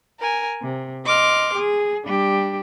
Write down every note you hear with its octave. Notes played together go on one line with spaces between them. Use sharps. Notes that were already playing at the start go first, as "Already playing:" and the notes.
A#4 G#5
C3
D#5 C6 D6 F6
G#4
G3 D4 G4